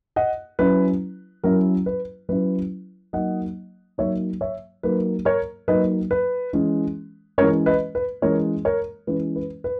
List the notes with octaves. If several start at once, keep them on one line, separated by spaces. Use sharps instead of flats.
D#5 F#5
F#3 C#4 E4 B4
F#3 C#4 E4 A#4
B4
F#3 C#4 E4 B4
F#3 A#3 D#4 D#5 F#5
F#3 A#3 D#4 C#5 E5
C#5 E5
F#3 A#3 D#4 B4
A#4 C#5
F#3 A#3 D#4 B4 D#5
B4
E3 G#3 C#4
E3 G#3 C#4 A#4 C#5
B4 D#5
B4
E3 G#3 C#4 A#4 C#5
A#4 C#5
E3 G#3 C#4 B4
B4
B4